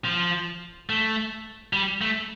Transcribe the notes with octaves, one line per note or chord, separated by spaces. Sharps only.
F3
A3
G3
A3